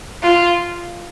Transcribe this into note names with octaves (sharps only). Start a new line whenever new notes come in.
F4